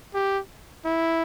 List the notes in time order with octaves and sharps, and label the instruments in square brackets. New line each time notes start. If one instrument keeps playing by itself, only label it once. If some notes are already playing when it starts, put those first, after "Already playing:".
[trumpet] G4
E4